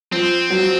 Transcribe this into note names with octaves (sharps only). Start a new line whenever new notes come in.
F3 C4
F#3